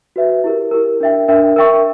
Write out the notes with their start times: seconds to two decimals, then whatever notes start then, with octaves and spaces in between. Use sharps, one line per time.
0.16 F#4 B4 E5
0.44 E4 G4 A#4
0.71 E4 G4 A#4
1.00 D4 A#4 E5 G5
1.28 D4 A#4 E5 G5
1.56 A#4 E5 G5 C#6